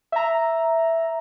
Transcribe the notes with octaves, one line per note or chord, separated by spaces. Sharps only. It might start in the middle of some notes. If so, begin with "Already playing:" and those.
E5 A#5